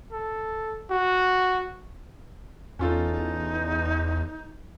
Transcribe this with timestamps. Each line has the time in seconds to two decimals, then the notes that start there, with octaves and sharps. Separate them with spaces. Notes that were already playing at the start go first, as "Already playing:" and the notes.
0.12 A4
0.91 F#4
2.79 E2 C#4 D#4 F4 A4